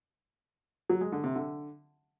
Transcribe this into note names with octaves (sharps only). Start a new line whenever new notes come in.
F#3
G#3
D3
C3
D3